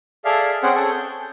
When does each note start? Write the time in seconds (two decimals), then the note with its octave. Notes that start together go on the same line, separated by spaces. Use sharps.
0.25 G#4 A4 D5 E5 F5
0.63 C4 C#4 G#4 C5 F#5 G5
0.75 G#4 A4 C#6
0.90 G6